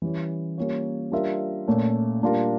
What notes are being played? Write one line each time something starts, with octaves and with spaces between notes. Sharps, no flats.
E3 G3 C#4 E4
G3 A#3 C#4 F4 C#5
G3 D4 F4 A#4 E5
A#2 A3 C#4
A#2 G3 D4 F4 A#4